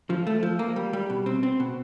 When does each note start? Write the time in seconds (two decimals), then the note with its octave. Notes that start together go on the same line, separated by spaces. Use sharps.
0.10 F3
0.27 A3
0.43 F3
0.59 A#3
0.76 G3
0.93 G3
1.10 B2
1.26 C4
1.43 C4
1.60 B2